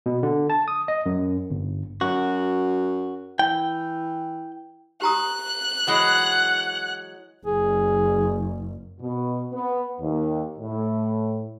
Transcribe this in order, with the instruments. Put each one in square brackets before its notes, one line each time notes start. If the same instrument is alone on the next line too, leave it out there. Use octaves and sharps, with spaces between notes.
[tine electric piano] B2
D3
A5
D#6
D#5
F#2
G1
[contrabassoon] F#2 [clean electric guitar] F#4
[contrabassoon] E3 [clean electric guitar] G5
[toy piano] G4 A#5 D#6 [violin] F#6
[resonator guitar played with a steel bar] E3 F#3 G#3 [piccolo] F#5
[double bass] F#1 [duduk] G#4
[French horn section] B2
B3
D#2
A2